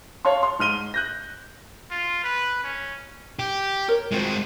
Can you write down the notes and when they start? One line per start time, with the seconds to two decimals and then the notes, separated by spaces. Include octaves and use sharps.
0.25 C#5 F5 A5 C6
0.43 C6
0.59 G#2 F6 D#7 G7
0.94 F#6 G6 A#6
1.91 F4
2.24 B4
2.64 C#4
3.39 G4
3.88 A#4 C#5
4.12 G#3 C4 F4 F#4 C5